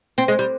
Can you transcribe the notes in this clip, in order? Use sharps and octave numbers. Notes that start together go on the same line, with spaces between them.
C4
G#3
G3